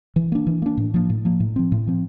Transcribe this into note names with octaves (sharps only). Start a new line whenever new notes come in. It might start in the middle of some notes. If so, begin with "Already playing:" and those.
E3
A#3 D4
E3
A#3 D4
A2
F3 A#3
A2
F3 A#3
A2
F3 C4
A2
F3 C4